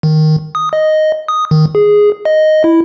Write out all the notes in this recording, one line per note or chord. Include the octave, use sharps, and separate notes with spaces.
D#3
D#6
D#5
D#6
D#3
G#4
D#5
E4